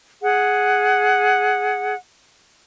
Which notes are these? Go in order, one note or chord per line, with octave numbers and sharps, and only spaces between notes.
G#4 F#5